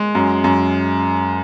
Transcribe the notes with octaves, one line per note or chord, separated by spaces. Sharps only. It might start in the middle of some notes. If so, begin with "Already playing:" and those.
Already playing: G#3
F#2
F#2